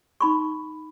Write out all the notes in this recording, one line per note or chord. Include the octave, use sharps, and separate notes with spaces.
D#4 B5 C#6